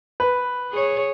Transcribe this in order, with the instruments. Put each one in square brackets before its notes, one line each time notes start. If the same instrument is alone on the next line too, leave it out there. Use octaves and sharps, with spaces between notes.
[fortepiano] B4
[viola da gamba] G#4 C#5